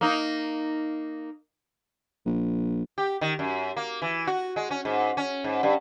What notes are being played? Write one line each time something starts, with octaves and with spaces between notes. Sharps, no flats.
A#3 D#4
A#1
G4
D#3
F#2
A#3
E3
F#4
G#3
C#4
G#2
C#4
G#2
G2